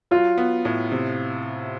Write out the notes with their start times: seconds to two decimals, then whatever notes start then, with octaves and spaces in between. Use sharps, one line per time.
0.11 F#3 F4
0.38 B3
0.65 A2
0.92 C3